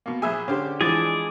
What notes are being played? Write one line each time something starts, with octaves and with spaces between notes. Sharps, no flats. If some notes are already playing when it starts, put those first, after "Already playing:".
B2 A#3
A#1 G#4 E5 G#5
D3 C#4 G4 C5 F5
E3 F3 G#3 D4 G#4 D5